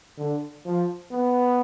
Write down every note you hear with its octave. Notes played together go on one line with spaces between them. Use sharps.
D3
F3
B3